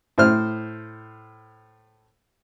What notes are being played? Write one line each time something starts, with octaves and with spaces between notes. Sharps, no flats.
A2 C5 F6